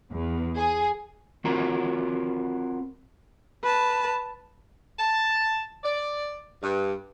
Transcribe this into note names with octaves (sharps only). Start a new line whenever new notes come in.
E2
G#4
C4 F4 F#4 A#4
B4 A5
A5
D5
G2